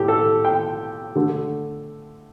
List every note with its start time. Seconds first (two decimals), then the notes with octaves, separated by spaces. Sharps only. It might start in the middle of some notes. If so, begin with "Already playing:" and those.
Already playing: A2 A3 G4
0.08 A4
0.45 G5
1.15 D3 A3